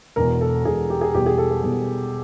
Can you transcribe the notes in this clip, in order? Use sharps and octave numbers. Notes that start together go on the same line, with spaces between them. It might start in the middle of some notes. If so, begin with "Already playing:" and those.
E1 E2 B2 A#4
A4
E1 E2 B2 G#4
G4
G#4
E2 B2 G3 B3 G4
G#4
A4
A4
E2 B2 G3 B3